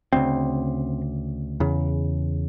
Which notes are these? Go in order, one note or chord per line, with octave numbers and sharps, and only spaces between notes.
D2 C#3 C4
E2 C#3